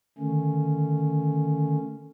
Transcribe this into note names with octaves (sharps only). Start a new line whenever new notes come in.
D3 D#3 A3 C#4